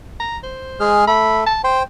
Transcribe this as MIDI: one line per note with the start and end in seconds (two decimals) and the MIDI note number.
0.20 0.37 82
0.44 0.97 72
0.80 1.05 56
0.80 1.05 68
0.80 1.05 89
1.07 1.44 57
1.07 1.44 69
1.07 1.41 83
1.46 1.64 81
1.64 1.83 72
1.64 1.83 79
1.64 1.79 84